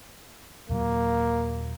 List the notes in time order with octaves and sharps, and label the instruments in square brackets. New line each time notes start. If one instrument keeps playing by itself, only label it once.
[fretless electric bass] D#2 A#2 F#3 [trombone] A#3